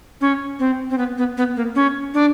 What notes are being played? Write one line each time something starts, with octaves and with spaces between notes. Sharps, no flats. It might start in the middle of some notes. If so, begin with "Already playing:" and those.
C#4
C4
C4
B3
B3
B3
A#3
C#4
D4